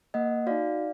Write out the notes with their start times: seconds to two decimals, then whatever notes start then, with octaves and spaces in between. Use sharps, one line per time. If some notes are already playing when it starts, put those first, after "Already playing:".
0.14 A#3 D#5 F#5
0.47 D#4 F#4 D5 F5